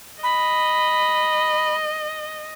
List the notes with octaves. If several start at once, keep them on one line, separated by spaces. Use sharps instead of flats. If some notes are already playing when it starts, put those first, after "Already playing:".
D#5 B5